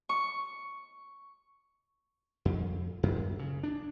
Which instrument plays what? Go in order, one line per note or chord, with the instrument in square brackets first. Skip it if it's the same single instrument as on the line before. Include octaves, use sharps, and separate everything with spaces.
[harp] C#6
[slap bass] F2
F#2
C#3
D4